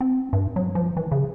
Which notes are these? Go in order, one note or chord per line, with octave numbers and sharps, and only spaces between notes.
C4
G2
F#3
F3
E3
C#3